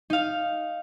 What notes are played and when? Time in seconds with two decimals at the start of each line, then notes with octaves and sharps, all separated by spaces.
0.10 D#4 F5